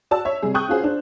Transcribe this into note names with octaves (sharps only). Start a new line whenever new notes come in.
F#4 D5 A5 E6
C#5 E5
C3 G3 G#4
G5 C#6 D#6 F#6 G6
C#4 F4 F#4 G#4 C5
D4 C5